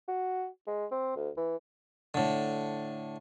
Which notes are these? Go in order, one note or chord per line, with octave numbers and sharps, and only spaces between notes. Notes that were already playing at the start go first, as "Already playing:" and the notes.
F#4
G#3
C4
D2
E3
A2 D3